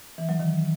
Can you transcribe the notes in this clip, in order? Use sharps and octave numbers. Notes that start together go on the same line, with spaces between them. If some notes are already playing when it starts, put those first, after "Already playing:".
E3
F#3
D#3